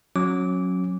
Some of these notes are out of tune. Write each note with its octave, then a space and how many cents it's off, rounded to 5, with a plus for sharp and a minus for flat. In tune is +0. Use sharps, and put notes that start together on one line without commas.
F#3 -15 C#4 -20 D6 -15